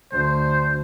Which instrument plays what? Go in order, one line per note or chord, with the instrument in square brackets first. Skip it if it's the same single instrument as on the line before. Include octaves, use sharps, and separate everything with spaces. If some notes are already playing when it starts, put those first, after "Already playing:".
[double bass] D2 [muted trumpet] C5